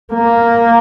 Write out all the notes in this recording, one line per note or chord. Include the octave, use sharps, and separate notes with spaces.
A#3